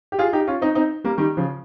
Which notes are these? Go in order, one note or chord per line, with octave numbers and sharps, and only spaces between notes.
G4
F4 G#4
D#4 G4
C#4 F4
C4 D#4
C4 D#4
G3 A#3
D#3 G3
C#3 F3